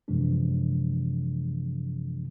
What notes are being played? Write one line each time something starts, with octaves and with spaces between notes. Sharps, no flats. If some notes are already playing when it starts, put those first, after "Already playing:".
F#2 C3 E3 F3 G#3 D4